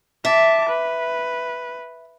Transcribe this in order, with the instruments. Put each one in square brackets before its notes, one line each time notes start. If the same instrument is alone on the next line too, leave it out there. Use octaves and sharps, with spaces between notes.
[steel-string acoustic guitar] E5 [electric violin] A5 D6
[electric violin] B4